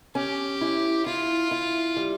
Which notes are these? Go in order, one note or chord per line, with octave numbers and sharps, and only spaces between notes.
C#4 G4
E4
E4 F4
E4
G3